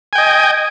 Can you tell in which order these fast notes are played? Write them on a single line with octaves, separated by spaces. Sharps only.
G#5 G5 D#5